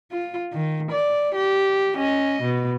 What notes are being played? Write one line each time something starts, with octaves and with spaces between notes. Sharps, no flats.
F4
D#3
D5
G4
C#4 D#5
B2